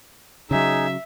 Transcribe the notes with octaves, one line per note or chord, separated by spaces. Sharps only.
C#3 F#3 D#4 G#4 E5